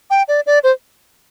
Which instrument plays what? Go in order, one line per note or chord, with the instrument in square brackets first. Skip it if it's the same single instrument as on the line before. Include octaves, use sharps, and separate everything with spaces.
[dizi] G5
D5
D5
C5